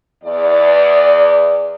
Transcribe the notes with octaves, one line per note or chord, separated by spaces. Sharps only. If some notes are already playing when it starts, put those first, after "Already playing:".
E2 D5